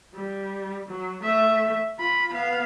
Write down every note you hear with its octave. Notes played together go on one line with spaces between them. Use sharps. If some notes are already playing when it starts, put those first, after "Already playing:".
G3
F#3
A3 E5
F4 B5
B3 F5